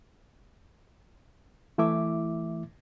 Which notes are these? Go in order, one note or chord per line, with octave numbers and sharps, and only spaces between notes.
E3 A3 E4 E5 D6